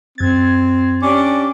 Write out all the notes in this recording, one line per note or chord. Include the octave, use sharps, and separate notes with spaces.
F#2 C4 G#6 A6
C#4 D4 G4 D6